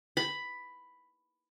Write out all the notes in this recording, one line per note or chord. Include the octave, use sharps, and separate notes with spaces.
B5